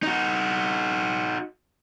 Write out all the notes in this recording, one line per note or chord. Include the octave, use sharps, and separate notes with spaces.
D#4 F#4